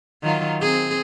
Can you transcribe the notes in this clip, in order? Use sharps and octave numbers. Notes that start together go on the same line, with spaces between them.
D#3 F#3 F4
C4 G#4